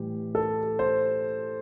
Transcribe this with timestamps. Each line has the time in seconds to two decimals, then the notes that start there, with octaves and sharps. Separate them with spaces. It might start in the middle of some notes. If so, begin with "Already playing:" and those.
Already playing: A2 E3 G3 G4
0.35 A4
0.79 C5